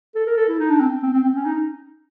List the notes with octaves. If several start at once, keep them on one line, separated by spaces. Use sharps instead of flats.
A4
A#4
A4
E4
D#4
D4
C4
C4
C4
C4
C#4
D#4